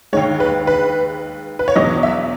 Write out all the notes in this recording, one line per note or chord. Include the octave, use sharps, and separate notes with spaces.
D#2 D#3 G#3 C#5
B4
B4
B4
C#5
E2 B2 F#3 D#5
E5